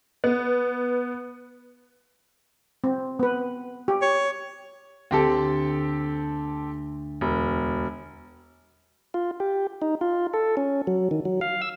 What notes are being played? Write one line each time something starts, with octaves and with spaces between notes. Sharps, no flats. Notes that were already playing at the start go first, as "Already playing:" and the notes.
B3
C4
B3 B4
G4
C#5
D2 C4 G4 A4
E1
F4
G4
D#4
F4
A4
C#4
F#3
D#3
F#3
F5
E6